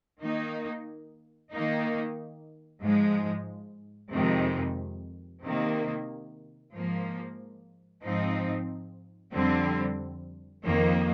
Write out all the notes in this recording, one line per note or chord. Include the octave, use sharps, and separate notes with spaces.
D#3 A#3 D#4
D#3 A#3 D#4
G#2 F3 G#3
F2 C3 D#3 G#3
C3 D#3 A#3
G#2 F3 A#3
G#2 F3 C4 D#4
F2 D3 G3 C4
F2 D#3 A#3